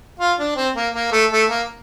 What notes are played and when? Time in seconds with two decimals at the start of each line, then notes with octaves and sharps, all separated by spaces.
0.20 F4
0.39 D4
0.56 C4
0.75 A#3
0.94 A#3
1.12 A3
1.32 A3
1.50 A#3